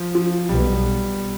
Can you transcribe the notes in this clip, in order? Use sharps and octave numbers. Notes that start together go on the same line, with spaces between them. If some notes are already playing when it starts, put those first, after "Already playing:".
Already playing: F3
F3
B1 B2 G3 B3